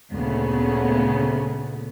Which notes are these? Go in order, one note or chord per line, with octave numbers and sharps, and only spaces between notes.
D2 A#2 C#3 A3 B3